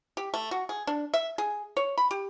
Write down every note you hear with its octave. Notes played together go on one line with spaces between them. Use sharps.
G4
A3
F#4
G#4
D4
E5
G#4
C#5
B5
G4